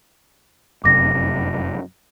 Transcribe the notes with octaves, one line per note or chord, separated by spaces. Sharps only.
F1 F#2 C3 D6 A#6